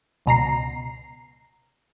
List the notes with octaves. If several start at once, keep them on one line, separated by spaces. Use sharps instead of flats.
C#2 B2 A#5 C7